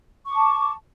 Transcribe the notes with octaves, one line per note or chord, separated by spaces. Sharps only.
A5 C#6 D6